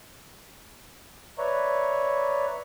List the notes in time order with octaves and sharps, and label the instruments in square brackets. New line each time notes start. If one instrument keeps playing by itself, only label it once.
[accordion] B4 C#5 D5 E5 A#5 C#6